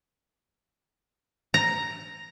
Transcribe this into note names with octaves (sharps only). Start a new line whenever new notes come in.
A#5